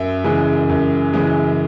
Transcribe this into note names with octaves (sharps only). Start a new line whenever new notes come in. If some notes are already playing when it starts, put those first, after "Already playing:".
Already playing: F#2 E5
C#3 E3 G#3
F#2
C#3 E3 G#3